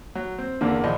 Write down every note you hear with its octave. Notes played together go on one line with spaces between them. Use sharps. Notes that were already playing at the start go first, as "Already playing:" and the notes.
F#3
C4
E2 D3 A#3
A#1 F3 D#5